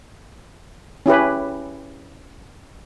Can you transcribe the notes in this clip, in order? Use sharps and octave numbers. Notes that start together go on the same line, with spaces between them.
C#4 E4 G4 B4